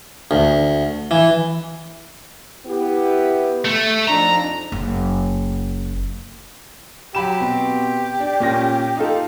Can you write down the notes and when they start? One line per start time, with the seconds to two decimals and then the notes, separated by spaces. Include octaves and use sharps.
0.31 D2
1.11 E3
2.66 B3 E4 G4
3.65 A3
4.08 F2 D4 D#4 A#5
4.72 F#1
7.15 F#3 G4 B5 E7
7.40 B2 C4
8.20 D4
8.40 A#2 C#4 A#6
8.97 D#4 F4 A4